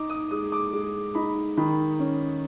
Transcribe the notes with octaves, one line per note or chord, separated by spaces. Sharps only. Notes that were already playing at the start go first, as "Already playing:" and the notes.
Already playing: D#4 D6
D#6
G#3 D#6
D6
G#3
D#4 B5
D#3 B5
C#4